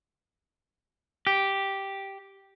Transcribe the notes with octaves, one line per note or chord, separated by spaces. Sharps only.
G4